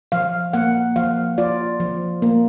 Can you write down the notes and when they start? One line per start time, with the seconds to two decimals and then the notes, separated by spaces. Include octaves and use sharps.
0.12 F3 F5
0.53 A#3 F#5
0.96 F3 F5
1.38 F4 D5
1.80 F3
2.22 A#3